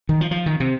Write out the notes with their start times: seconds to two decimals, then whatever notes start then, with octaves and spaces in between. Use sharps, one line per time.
0.09 D#3
0.21 F3
0.31 F3
0.46 D#3
0.60 C3